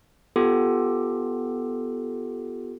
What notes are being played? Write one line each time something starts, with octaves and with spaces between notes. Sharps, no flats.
B3 F4 G4 A4